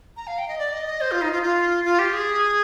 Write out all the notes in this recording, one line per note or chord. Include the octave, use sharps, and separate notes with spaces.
A#5
F5
G5
D#5
D5
D#5
D#5
C5
F4
D#4
F4
F4
F4
G4
G#4